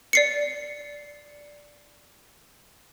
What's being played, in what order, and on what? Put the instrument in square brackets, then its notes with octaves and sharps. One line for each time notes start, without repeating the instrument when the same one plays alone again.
[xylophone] D5 C7 C#7